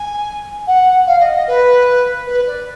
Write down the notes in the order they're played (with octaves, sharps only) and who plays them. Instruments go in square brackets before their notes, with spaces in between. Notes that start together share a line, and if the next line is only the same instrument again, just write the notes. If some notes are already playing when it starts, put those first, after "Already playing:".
Already playing: [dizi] G#5
F#5
F5
D#5
D#5
B4
B4
D5